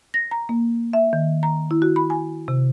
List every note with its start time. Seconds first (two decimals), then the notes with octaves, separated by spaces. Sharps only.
0.14 A#6
0.31 A#5
0.49 A#3
0.93 E5
1.13 D#3
1.43 A#5
1.71 E4
1.82 F#4
1.96 B5
2.10 G#5
2.48 C3